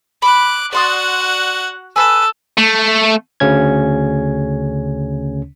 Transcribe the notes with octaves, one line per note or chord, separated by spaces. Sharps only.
B5 D6 F#6
F#4 D5 F#5 C6 D#6
A4 B4 G#5 E6
A3
D2 C#3 C#4 G#6